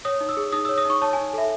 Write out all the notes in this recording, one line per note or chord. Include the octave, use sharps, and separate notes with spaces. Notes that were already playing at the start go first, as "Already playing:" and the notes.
C#5 D#6
D#4
E6
G#4
D#4 D#6
E6
C#5
D#6
D#4 C#6
C#5 A5
G#5
D#4
A4 E5